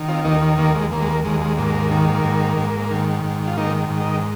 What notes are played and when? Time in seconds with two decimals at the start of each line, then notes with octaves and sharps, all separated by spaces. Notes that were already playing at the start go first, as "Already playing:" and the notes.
Already playing: D#3
0.08 C4 F4
0.25 D#2 A#3 D#4
0.58 D#2 A#3
0.75 G#3
0.92 D#2 A#3
1.01 G#3
1.08 A#3
1.25 D#2 G#3
1.42 G#3
1.58 G#2 A#3
1.91 D#3
2.24 G#2
2.57 G#2
2.91 D#3
3.24 G#2
3.47 F4
3.57 D#3 A#3 D#4
3.90 G#2
4.01 A#4 D#5